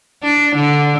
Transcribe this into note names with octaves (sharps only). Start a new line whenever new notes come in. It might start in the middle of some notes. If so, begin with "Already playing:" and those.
D4
D3